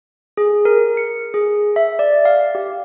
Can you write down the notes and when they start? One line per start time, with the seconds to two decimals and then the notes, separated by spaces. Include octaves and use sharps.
0.37 G#4
0.65 A#4
0.97 C#7
1.34 G#4
1.76 E5
1.99 D5
2.25 F5
2.55 G4